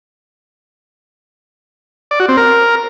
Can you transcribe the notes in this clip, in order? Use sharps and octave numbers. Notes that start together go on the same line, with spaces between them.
D5
F#4
C4
A#4